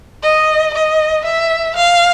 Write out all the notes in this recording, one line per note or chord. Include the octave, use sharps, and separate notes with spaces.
D#5
D#5
E5
F5